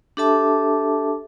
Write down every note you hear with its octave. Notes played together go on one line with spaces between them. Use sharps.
D4 G4 A4 E5 A5 D6